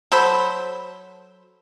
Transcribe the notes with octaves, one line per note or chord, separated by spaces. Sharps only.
F#3 A4 C5 B5